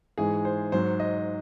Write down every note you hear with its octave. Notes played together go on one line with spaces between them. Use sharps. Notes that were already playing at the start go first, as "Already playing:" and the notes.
G#2 E3 G#3 G#4
C5
G#2 F#3 C5
D#5